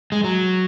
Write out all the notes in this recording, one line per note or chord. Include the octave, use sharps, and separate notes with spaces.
G#3
F#3